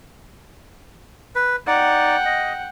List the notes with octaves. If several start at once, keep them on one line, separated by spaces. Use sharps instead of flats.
B4
D#4 D5 F#5 G5
D#5